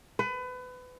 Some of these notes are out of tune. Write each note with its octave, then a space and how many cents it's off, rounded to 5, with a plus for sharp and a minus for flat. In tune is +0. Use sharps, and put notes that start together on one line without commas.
B4 +30